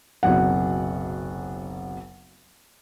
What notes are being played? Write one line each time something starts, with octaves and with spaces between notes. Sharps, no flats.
F#1 B1 C3 F#3 F#5